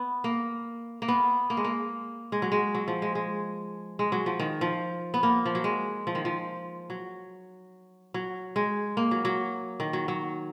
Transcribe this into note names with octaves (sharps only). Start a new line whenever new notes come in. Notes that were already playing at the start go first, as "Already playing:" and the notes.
Already playing: B3
A#3
A#3
B3
A#3
G#3
A#3
G#3
F#3
G#3
F#3
F3
G#3
G#3
G#3
F#3
F3
D#3
F3
B3
A#3
F3
F#3
G#3
F3
D#3
F3
F#3
F#3
G#3
A#3
F#3
F#3
D#3
F#3
F#3